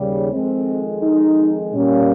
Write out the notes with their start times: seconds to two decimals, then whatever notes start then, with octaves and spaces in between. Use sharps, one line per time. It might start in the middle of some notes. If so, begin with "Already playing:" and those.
Already playing: D#2 C#3 G3
0.30 F2 D#3 G#3 C4
1.02 D#4
1.72 A#2 G3 A#3 C#4